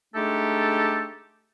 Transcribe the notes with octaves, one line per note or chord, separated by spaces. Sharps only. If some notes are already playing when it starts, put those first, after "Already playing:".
G#3 A3 D4 D#4 G4 A4